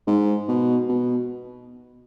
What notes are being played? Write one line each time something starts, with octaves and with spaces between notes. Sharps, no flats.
G#2
B2
B2